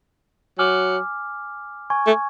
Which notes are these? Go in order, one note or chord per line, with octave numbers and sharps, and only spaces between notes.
F#3 G#5 D6 F6
G#5 C#6 G#6
A3